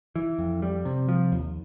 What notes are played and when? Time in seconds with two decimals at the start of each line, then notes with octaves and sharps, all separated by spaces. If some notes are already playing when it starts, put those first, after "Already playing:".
0.16 E3
0.39 F2
0.62 G3
0.85 C3
1.09 F3
1.32 D#2